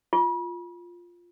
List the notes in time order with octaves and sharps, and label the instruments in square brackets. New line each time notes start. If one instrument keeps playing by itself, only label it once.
[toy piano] F4